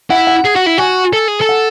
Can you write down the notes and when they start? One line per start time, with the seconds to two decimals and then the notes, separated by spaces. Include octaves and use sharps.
0.10 E4 F#5
0.27 F#5
0.45 G#4
0.56 F#4
0.66 E4
0.78 F#4 G#5
1.13 A4
1.28 G#4
1.41 A4
1.49 F#5